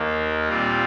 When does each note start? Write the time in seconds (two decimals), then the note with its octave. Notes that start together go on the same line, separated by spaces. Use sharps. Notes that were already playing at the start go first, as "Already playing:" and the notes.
Already playing: D#2 D#3 A#3
0.48 A#2 G3 C4 F4